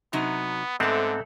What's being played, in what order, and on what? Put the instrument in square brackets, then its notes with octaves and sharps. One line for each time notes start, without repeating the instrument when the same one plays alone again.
[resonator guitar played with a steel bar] C3 F#3 D#4 [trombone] B3
[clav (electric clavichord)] G#2 B3 C4 [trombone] D3 [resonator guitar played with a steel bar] A3 A4